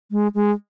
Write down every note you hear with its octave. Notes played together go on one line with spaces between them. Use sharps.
G#3
G#3